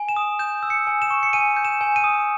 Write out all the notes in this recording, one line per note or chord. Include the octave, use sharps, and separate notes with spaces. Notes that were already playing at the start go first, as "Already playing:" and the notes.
Already playing: G#5
E7
D#6
G6 E7
E6
C#7
G#5
E7
C#6
C#7
G#5 D#7
G6
E7
G#5
D#7
D#6